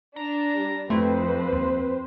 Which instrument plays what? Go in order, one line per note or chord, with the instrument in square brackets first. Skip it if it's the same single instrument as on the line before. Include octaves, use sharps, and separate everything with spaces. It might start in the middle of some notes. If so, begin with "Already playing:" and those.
[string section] D4 [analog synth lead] A#5
[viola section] G3
[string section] F2 [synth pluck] A3 E4 [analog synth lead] C4 [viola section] B4 C5
[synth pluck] D#2